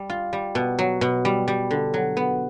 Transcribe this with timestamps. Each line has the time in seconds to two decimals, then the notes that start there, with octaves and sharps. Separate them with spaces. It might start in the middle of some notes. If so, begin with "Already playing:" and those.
Already playing: G3
0.10 F4
0.33 G3
0.55 B2
0.79 F#3
1.01 B2
1.25 G3
1.48 G3
1.71 D3
1.94 F#3
2.17 B3